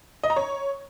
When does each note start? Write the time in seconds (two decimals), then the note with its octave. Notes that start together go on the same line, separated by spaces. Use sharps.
0.23 D#5
0.30 A#5
0.36 C#5